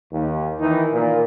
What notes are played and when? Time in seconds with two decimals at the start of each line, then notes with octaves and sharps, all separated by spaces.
0.12 D#2
0.60 D#3 E3 D#4
0.93 A#2